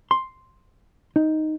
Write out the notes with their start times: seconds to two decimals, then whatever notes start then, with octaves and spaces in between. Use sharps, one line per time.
0.11 C6
1.16 D#4